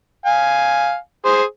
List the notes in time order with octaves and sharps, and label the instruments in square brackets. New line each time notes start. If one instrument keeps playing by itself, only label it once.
[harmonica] F5 G#5
G#4 C5